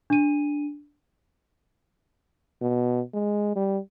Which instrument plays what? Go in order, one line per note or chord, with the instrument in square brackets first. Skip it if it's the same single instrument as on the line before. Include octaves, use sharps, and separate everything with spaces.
[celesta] D4 D#7
[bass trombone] B2
G#3
G3